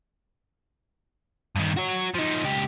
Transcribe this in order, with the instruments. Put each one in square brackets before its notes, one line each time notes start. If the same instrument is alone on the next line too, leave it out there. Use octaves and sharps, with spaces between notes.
[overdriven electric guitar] G2 D#3
F#4 C#5
F3 D#4
C#2 G4